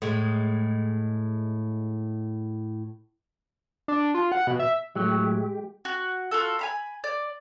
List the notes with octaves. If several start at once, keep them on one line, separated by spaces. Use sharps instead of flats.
A2 G#3
D4
F4
F#5
B2
E5
A2 F#3 G#3 A3 G4
F#4
F4 F#4 A4
G#5 A#5 B5
D5